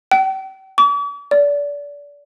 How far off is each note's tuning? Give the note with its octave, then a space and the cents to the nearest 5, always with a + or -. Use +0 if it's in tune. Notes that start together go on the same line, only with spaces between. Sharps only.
G5 -40
D6 -45
D5 -30